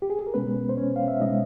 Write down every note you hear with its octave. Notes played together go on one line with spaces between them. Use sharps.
G4
G#4
A4
A#4
B2 G#3 B3 C#4 B4
C5
C#4 C#5
F5
E5
B2 G#3 C#4 D#4 D#5